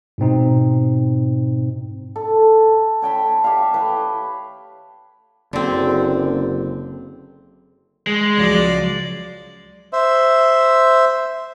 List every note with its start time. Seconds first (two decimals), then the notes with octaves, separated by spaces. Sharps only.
0.18 G#2 B2 C4 D#4
2.16 A4
3.02 C#5 G5 A5 B5
3.44 G4 C#5 E5 F5
3.74 B4 G5
5.53 F#1 D3 C4
8.07 G#3
8.37 C#2 F3 F#3 D5
9.93 C5 E5